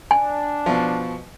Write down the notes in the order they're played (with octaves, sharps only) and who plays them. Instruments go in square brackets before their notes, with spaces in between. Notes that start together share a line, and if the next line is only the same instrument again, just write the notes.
[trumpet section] D4 [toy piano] G#5
[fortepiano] B2 F3